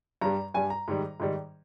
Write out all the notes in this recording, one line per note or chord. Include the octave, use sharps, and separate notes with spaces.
G2 G3 A#5
G2 G3 G#5
A#5
G#2 D#3 G3
G#2 D#3 G3